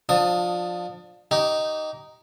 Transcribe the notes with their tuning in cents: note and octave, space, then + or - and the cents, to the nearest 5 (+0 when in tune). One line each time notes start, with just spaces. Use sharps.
F3 +20 D4 +25 D#6 +0
D#4 +0 G4 -25